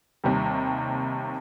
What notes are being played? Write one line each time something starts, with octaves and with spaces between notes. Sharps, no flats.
D#2 C3 G3